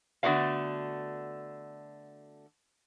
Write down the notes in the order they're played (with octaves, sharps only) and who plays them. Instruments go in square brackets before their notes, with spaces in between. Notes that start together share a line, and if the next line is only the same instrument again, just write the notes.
[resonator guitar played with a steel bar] D3 A3 B3 F#4 D5 F5